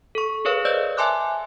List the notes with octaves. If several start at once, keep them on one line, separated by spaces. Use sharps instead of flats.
A4 C#6
G#4 A#4 B4 C#5 F5
B4 C5 D5 D#5 E6 G6
E5 G#5 A5 C6 D6 F#6